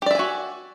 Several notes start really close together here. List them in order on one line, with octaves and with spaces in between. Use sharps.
G4 D5 E5 G#5 F#4